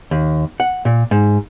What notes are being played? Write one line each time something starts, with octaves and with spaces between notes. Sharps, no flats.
D#2
F#5
A#2
G#2